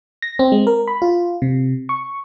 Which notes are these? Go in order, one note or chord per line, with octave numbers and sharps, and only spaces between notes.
A#6
C4
G#3
A#4
B5
F4
C3
C#6